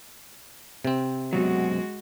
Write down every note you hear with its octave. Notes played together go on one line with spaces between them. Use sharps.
C3 C4
F#2 B2 F#3 G#3 F#4